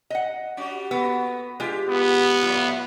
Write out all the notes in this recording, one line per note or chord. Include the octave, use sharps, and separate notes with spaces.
D#5 F#5
G3 C#4 F#4
A#3 B3 F#4 A4
G2 G#3 F4 G4
B3
A#2 F#3 A3 F4